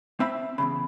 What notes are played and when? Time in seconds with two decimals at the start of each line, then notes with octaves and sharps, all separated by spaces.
0.20 C4 E5 B5
0.58 E2 G#2 C#3 B5